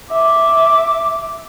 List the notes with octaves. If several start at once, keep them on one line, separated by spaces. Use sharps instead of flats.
E5 D6